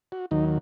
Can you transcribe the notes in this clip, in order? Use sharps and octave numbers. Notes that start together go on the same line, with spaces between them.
F#4
D#2 D#3 F#3 D#4